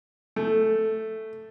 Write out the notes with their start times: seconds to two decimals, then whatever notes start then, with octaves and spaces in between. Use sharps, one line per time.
0.36 A3